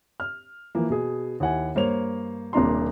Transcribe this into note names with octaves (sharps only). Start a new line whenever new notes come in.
F6
E3 F3 A#3
B2 G#4
D#2 E4 F#5 G#5
G2 A#3 C5 C#5 F7
D#1 C3 A#3 D4 A#5 C6